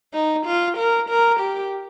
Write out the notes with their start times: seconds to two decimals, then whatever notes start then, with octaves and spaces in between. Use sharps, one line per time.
0.14 D#4
0.46 F4
0.77 A#4
1.09 A#4
1.40 G4